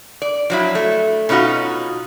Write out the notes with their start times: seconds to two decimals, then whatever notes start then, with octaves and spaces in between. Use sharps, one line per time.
0.22 D5
0.50 F3 F#3 E4
0.75 A3
1.29 B2 C#4 D#4 F4 F#4